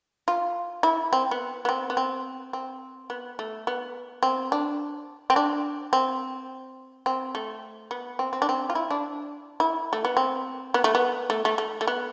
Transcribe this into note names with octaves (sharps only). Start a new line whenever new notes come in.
F4
E4
C4
B3
B3
C4
B3
C4
C4
B3
A3
B3
C4
D4
C4
D4
C4
C4
A3
B3
C4
C4
D4
C4
F4
E4
D4
E4
A3
B3
C4
B3
A3
B3
A3
A3
A3
A3
B3